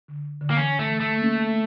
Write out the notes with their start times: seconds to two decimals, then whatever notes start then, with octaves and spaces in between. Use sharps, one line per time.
0.08 D3
0.41 D3
0.51 A#3
0.57 E3 C#4
0.79 A3
0.90 E3
1.00 A3
1.18 A#3
1.22 C#4